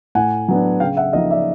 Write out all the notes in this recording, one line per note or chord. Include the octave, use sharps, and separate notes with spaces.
A2 F#5 G#5
F#3 B3 D4
C#3 F5 G5
E5 F#5
F3 A#3 D#4 D#5 F5
D5 E5